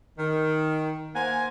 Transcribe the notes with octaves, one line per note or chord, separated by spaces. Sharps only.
D#3
A#3 C5 F#5 G#5